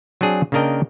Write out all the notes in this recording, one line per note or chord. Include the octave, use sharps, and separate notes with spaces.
F#3 C4 D4 G#4
C#3 A#3 D4 A#4 D#5 G5